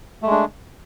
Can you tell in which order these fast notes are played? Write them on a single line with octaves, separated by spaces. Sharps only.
A3 G#3 D4